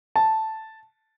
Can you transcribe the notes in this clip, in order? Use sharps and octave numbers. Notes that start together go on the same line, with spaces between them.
A5